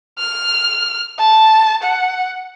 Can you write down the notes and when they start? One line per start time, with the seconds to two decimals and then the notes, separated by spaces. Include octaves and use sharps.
0.19 F6
1.19 A5
1.83 F#5